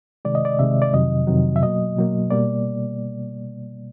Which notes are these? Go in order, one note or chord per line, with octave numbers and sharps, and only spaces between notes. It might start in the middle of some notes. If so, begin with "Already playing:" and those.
C3 D#3 G#3 D5
D#5
D5
C3 D#3 G#3 E5
D5
F2 C3 D#3 F#3 D#5
F2 C3 D#3 F#3
E5
B2 F#3 A#3 D#5
B2 F#3 A#3
B2 G3 A#3 D5